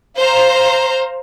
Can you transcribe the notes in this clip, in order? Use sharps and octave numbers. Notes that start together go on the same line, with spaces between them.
C5 F5 A#5